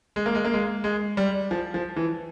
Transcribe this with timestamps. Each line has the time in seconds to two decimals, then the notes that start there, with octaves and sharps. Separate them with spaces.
0.16 G#3
0.26 A#3
0.35 G#3
0.45 A#3
0.54 G#3
0.84 G#3
1.17 G3
1.51 F3
1.74 F3
1.97 E3